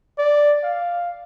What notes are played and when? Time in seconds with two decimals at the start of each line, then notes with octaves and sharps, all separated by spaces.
0.18 D5
0.63 F5